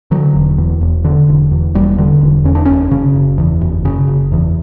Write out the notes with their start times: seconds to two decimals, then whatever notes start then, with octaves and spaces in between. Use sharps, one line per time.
0.11 D3 F#3
0.35 E1
0.58 E2
0.81 E1
1.04 D3
1.28 E1
1.51 E2
1.75 E1 G3
1.98 D3
2.21 E1
2.44 E2 C#4
2.55 D4
2.65 F#1 C#4
2.91 C#3
3.15 F#1
3.38 E2
3.61 F#1
3.85 C#3
4.08 F#1
4.32 E2